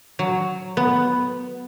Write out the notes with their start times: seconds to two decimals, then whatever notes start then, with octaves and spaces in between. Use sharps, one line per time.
0.19 F#3
0.77 B3